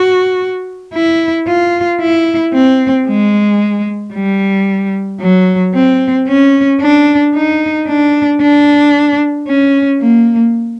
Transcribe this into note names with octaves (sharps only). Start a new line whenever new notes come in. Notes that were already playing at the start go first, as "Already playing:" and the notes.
Already playing: F#4
E4
F4
E4
C4
G#3
G3
F#3
C4
C#4
D4
D#4
D4
D4
C#4
A#3